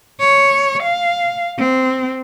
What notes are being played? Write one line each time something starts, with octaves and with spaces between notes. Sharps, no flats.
C#5
F5
C4